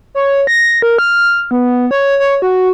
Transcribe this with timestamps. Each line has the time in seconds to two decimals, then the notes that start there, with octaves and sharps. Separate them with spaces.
0.15 C#5
0.47 A#6
0.82 A#4
0.98 F6
1.51 B3
1.91 C#5
2.20 C#5
2.42 F#4